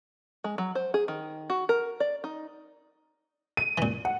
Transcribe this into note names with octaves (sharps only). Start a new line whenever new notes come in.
G#3
F#3
C5
G#4
D#3
F#4
A#4
D5
D#4
D#7
A#2 E3
F#5